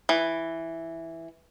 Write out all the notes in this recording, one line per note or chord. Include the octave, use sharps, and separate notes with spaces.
E3